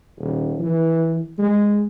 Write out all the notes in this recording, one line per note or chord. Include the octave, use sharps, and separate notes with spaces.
D#1
E3
G#3